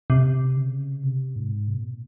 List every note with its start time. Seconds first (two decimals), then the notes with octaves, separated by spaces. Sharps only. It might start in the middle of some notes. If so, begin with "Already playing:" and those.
0.10 C3
0.57 C#3
1.04 C3
1.36 G#2
1.67 C3
1.77 A#2